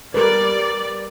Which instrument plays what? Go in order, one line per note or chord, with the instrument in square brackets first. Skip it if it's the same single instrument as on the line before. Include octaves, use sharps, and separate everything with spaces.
[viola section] G3 D5 [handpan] A#4 B4